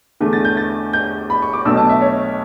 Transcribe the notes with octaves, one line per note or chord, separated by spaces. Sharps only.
E2 D3 A3
A6
G6
A6
G6
B5
C#6
D6
B1 B2 A3 D4 E6
A5
E5
C#5